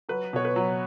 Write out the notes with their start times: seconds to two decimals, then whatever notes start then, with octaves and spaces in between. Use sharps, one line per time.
0.09 F#3 B4
0.33 B2 C#5
0.45 B4
0.56 F#3